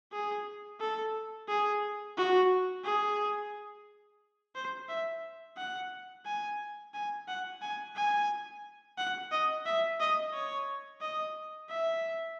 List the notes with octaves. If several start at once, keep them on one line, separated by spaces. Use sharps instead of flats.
G#4
A4
G#4
F#4
G#4
C5
E5
F#5
G#5
G#5
F#5
G#5
G#5
F#5
D#5
E5
D#5
C#5
D#5
E5